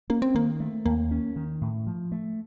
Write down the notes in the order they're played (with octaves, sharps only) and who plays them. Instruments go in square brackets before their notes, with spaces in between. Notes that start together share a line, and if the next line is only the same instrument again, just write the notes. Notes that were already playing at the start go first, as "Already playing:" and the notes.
[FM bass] A#3 [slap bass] C#4
[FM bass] C4
[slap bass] D#3 [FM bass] A#3
[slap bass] A3
[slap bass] D#2 [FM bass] A#3
[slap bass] C#4
D#3
A2
F3
A3